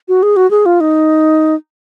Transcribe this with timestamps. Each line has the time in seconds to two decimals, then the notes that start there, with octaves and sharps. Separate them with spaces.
0.08 F#4
0.23 G#4
0.36 F#4
0.51 G#4
0.66 F4
0.81 D#4